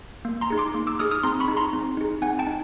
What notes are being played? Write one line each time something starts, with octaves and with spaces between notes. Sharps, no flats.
A#3
A#5 C6
D#4 G#4
C6 D6
A#3
D6 E6
D#4 G#4 D#6 F6
D#6 F6
C4 A#5 C6
B5 C#6
D#4 G#4
A#5 C6
C4
D#4 G#4
C4 F#5 G#5
G5 A5
D#4